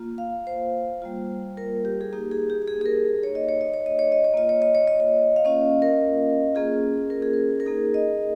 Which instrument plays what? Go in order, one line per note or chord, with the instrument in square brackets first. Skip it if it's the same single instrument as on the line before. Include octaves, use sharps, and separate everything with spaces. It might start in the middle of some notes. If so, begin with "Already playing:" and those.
Already playing: [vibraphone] A#3 F4
F5
C5
G3 A#3 F4
A#4
G4
G#4
A#3 D#4 G4
G#4
G4
G4
G#4
G#4
A#4
A#3 D#4 C#5
D#5
C#5
D#5
C#5
D#5
C#5
D#5
C#5
A#3 F4 D#5
C#5
D#5
C#5
D#5
C#5
F5
A#3 C#4 F4 D#5
A#4
A#3 C#4 F4 G#4
A#4
G#4
A#4
A#4
A#3 D#4 G#4
D#5